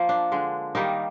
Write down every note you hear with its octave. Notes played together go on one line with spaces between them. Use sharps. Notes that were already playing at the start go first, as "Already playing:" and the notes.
Already playing: F3 A#3
D4
D3 G#3
D#3 G3 A#3 D#4